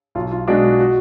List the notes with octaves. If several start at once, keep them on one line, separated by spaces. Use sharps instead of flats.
B1 F4
F4
B2 G#3 D4 F#4
F#4
F#4